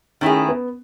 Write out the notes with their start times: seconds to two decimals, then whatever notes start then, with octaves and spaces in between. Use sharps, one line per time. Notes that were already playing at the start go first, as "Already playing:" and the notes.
0.21 D#3 A3 C#4 E4 G#4
0.49 B3